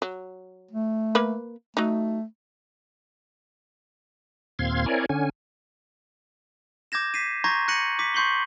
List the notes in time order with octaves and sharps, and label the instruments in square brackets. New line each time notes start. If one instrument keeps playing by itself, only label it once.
[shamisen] F#3
[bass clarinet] A3
[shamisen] A#3 B4
[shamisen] F#3 D#4 [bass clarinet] A3
[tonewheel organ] D#2 A#2 C4 F5 C6 G#6
C4 E4 A#4 C#5 D5 G#5
D3 C#4 G#5
[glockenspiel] D6 G6 G#6 A#6 E7
B6 C7 D#7
A#5 C6 C#6 G6 G#6 A#6
F#6 A#6 C#7 D#7 F#7
D6 B6
C6 C#6 G6 C7 F#7 G7